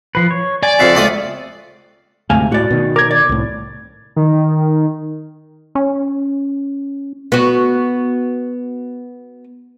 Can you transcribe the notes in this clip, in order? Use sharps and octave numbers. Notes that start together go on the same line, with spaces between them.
F3 B4
C#5
D5 G#5
F2 C#3 E5 F#5 C6
C#2 A3 D#6
D2 G#2 C3 A3 F5 G#5
A2 F#4 D5
B2 D#3
D#2 A#4 D6 G#6
D5
C2 A2
D#3
C#4
B3 F#4